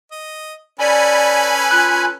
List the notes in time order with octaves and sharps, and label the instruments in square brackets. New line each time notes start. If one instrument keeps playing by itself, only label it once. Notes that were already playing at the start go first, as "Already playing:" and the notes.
[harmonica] D#5
[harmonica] C#4 A4 B4 [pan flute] D5 [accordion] G#5 B5
[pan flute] F4 [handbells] F#6